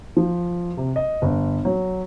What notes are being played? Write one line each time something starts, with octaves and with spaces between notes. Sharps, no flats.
F3
C3
D#5
G1
F#3